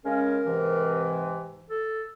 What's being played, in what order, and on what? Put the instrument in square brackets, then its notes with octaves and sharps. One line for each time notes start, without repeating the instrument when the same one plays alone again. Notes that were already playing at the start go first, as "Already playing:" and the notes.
[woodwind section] C#3 G#3 C#4 [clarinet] A#4
[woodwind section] G#2 C3 E3
[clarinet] A4